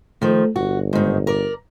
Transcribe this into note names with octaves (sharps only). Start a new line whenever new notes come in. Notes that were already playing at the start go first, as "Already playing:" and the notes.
D#3 F3 A3
G1 F#4
G#2 D#3
A#4 D5